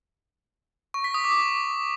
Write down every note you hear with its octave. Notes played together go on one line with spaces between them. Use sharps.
C#6
B6
D#6
D6